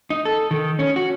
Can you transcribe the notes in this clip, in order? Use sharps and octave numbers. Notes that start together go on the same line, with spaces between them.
D#4
A4
D#3
C#4
F#4